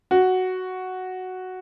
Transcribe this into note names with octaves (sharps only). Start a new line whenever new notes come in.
F#4